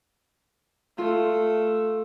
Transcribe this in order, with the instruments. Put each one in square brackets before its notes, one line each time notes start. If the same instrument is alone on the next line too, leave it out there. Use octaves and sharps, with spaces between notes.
[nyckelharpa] A3 [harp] F4